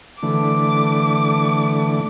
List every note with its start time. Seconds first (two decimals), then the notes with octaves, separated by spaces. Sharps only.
0.23 D3 E3 A3 D6